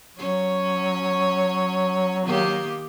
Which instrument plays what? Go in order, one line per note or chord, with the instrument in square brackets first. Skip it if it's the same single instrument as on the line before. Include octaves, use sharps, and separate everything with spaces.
[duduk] F#3 [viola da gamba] C#4 C#5
[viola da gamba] D#3 A#3 G4